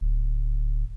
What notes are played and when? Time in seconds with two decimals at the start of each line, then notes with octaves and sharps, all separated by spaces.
0.01 D1